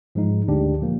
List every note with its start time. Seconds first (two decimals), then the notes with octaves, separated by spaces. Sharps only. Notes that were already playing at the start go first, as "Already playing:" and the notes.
0.15 G#2 F3 G#3 D#4
0.48 D2 D3 G#3 D4 G4
0.80 A#2 F3 A#3